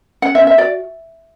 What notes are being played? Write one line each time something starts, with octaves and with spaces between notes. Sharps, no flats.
C#4 F#5
E5
C#4
E5
F#4 D5